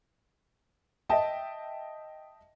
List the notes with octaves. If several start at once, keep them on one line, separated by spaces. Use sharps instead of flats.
D#5 E5 G5 A5